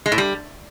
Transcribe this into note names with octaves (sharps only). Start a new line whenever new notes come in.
G#3
A2
G3